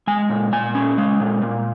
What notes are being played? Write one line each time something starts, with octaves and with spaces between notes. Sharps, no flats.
G#3 G#5
A#2
A#2 G#5
C#4
G#3
A#2
A#2